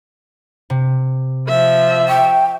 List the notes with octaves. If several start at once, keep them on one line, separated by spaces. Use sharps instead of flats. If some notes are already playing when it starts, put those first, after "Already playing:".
C3
F3 E5
G5 C#6